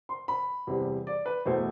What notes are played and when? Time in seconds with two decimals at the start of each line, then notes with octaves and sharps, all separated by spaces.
0.09 C6
0.28 B5
0.67 E2 C3 G3
1.07 D5
1.26 B4
1.46 E2 B2 A3 C5